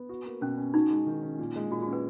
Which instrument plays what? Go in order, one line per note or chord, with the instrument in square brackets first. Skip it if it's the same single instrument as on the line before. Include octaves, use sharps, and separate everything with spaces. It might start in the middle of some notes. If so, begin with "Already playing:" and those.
Already playing: [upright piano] B3
F#4
A#3
[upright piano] B2 [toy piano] C#4
[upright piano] C#4
[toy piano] D#4 [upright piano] F#4
[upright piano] G#3
D#3
C#4
A#2
G#3
[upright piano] A#2 [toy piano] F#4
[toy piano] F#4
[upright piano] C#4
[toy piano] B4